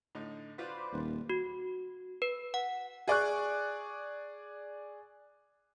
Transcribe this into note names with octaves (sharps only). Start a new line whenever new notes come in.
A2 D3 D#4
F4 F#4 B4 C5 D5
D#1 D#2
F#4
B4
F#5
G#4 D5 C#6 F#6